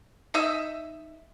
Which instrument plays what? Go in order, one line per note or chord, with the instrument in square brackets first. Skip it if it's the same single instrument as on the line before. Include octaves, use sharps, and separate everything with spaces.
[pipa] D#4 D#5 E5